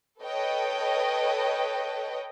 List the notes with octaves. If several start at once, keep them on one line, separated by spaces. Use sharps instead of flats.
A4 B4 C#5 D#5 G5